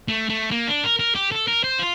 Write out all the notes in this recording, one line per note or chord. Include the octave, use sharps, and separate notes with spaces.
A3
A3
A#3
D4
A#4
A#4
G4
A4
A#4
C5
F4